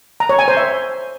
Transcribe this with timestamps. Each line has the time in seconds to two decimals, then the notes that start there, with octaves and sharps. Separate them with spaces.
0.20 A#5
0.29 C#5
0.39 G#5
0.48 C5
0.57 E5